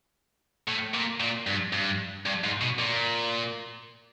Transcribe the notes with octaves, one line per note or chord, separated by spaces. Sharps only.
A2
A#2
A#2
G2
G2
G2
G#2
B2
A#2